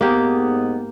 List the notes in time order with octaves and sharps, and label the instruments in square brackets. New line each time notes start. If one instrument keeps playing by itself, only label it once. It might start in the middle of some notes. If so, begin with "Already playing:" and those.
[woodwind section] G#2 B3 [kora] A#3 G4